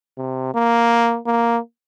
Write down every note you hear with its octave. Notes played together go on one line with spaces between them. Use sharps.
C3
A#3
A#3